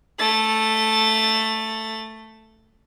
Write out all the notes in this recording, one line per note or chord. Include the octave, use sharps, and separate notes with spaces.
A3 A6